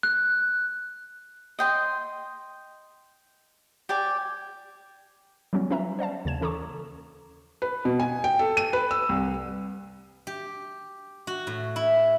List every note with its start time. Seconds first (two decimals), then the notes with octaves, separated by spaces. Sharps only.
0.03 F#6
1.59 D#5 G5 C6
3.89 G4 D5 G#5
5.53 F#3 G3 B3 C#4 F#4
5.70 C#4 F4 B4 E5 A#5
5.99 C5 D5 F5 A5
6.25 D#2 C#3 G#6 E7
6.41 E3 C#4 A4 A#5 C#6 D6
7.62 B4
7.85 B2
7.99 G#5
8.24 G5
8.39 A4
8.57 D#7
8.73 B4
8.91 E6
9.09 C2
10.27 G4
11.27 F#4
11.47 A2
11.76 E4